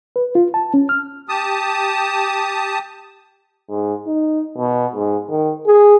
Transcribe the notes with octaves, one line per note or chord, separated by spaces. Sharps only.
B4
F4
A5
C#4
F6
G4 A5 D#6
G#2
D#4
B2
G#2
D#3
G#4